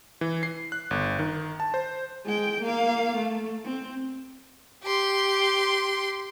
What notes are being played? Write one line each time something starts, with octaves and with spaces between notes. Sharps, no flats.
E3
C7
F#6
G1
D#3
A5
C5
G#3 G5
A#3 F5
A3
C4
G4 C6